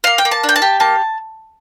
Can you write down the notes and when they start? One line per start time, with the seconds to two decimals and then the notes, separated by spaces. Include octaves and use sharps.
0.04 A#3 F5
0.18 G5
0.25 A#3
0.31 A5
0.43 D4
0.49 G5
0.56 A5
0.62 G4
0.80 A#3 A5